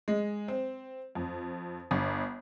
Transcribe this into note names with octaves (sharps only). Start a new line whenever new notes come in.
G#3
C4
F2
G1